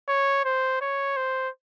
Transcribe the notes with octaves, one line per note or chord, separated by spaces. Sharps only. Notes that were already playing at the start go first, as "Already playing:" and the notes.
C#5
C5
C#5
C5